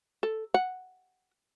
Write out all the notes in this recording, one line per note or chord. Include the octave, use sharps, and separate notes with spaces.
A4
F#5